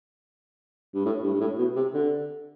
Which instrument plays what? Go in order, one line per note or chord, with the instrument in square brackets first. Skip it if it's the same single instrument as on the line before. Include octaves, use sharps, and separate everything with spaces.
[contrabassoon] G2
A2
G2
G2
A2
B2
C3
D3